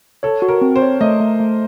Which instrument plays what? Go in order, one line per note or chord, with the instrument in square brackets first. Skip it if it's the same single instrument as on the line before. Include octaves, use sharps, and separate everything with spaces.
[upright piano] A4 [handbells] C#5
[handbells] F#4
[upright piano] A#4
[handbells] C4
[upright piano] C5
[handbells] C#5
[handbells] A3 [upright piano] D#5
[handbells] A3
A3